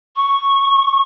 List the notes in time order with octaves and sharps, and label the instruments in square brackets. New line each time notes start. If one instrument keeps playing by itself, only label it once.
[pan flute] C#6